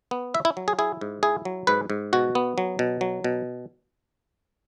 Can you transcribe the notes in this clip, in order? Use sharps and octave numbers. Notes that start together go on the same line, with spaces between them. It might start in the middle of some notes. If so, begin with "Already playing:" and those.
B3
E4 E5
E4
F#3
G#4
E4 G#4
G#2
E4 G#4
F#3
G#2 B4
G#2
B2 F#4
B3
F#3
B2
F#3
B2